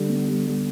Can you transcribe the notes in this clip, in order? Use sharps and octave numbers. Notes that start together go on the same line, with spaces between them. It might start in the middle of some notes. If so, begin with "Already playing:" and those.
Already playing: D3 G3
B3
G3
G3